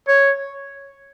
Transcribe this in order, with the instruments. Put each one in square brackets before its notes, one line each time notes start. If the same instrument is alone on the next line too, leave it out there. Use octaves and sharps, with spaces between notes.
[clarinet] C#5